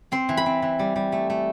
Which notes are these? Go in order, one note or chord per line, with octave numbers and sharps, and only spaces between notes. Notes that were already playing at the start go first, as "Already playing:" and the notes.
C4 C6
E3
B5
C4
E3
G3
G3
A3
A3